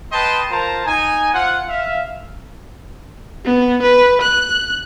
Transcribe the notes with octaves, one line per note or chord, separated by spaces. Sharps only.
B4 D#5 G5 A5 C6
F4 A#4 C5 A5 A#5
D#4 G#5
F4 C5 F#5
E5 F5
B3
B4
F#6